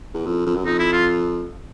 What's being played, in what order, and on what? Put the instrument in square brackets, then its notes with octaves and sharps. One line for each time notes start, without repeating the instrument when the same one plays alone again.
[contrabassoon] E2
F2
F2
F#2
[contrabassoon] F2 [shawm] D#4
[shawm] E4
F4